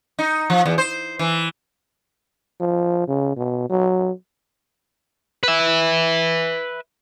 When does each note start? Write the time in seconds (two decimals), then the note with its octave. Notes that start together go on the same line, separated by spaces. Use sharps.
0.19 D#4
0.50 F3
0.66 E2
0.78 C5
1.19 E3
2.60 F3
3.08 C#3
3.37 B2
3.69 F#3
5.43 B4 E5